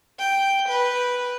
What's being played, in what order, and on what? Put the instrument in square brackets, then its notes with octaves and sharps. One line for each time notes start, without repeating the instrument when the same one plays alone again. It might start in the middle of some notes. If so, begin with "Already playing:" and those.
[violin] G5
B4